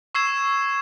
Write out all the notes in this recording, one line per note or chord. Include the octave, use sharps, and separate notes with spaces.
C#6 E6 G#6 C7 E7